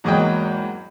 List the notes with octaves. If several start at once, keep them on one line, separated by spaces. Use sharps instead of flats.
E2 G#2 F#3 A#3 D#5 G5